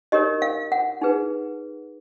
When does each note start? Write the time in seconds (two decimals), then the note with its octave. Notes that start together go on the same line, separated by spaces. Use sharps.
0.12 D#4 G4 A#4 C#5 D#5
0.42 F5
0.72 F#5
1.01 D#4 G#4 B4